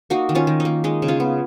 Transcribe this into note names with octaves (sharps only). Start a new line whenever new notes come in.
A#3 D#4 F#4
D#3
C#4 F4
D#3
D#4
A#3
G#3 D#4
C#3
C#4 F4
B3